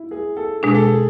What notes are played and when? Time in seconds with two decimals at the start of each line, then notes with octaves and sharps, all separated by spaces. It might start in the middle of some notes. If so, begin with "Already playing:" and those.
Already playing: E4
0.11 G#4
0.37 A4
0.63 B2 G#3 D4 G#4
0.75 A4
0.87 G#4